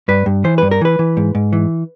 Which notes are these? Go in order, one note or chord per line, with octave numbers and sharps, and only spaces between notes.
G2 B4
G2
E3 C5
G2 B4
A#4
E3 B4
E3
G#2
G#2
E3